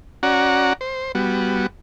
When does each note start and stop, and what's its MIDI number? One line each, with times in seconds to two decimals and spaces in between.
0.23 0.73 61
0.23 0.73 66
0.23 0.73 74
0.23 0.73 78
0.23 0.73 82
0.81 1.12 72
1.15 1.67 55
1.15 1.67 59
1.15 1.67 66